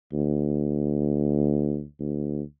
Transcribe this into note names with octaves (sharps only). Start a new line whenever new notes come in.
D2
D2